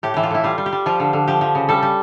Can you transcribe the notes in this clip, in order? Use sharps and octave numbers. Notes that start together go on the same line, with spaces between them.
A2 G4
E3 G4
F4
A2 E4
G3 F4
G3
G4
G3
F3 F4
D3
D3
F3 G4
F3
C#3
G3 A4
G3